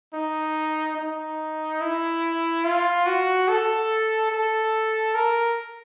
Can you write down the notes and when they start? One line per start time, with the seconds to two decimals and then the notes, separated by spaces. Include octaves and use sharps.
0.14 D#4
0.97 D#4
1.81 E4
2.64 F4
3.06 F#4
3.48 A4
4.32 A4
5.15 A#4